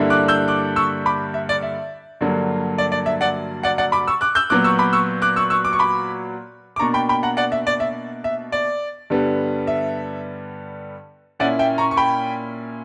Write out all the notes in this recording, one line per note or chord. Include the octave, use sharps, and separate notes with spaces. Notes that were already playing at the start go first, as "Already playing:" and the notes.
Already playing: G2 D3 G3 A#3 E4
D6 F#6
E6 G6
D6 F#6
C#6 E6
B5 D6
E5
D5
E5
G2 D3 F#3 A#3
D5
D5
E5
D5 F#5
D5 F#5
D5 F#5
B5 D6
C#6 E6
D6 F#6
E6 G6
A#2 F#3 B3 D6 F#6
C#6 E6
B5 D6
C#6 E6
D6 F#6
C#6 E6
C#6 E6
D6
C#6
B5 D6
D6
B2 A#3 D4 A#5 C#6
G5 B5
G5 B5
F#5 A#5
D5 F#5
E5
D5
E5
E5
D5
G2 D3 G3 B3
E5
A#2 A#3 C#4 E4 D5 F#5
E5 G5
A#5 C#6
C#6
G5 B5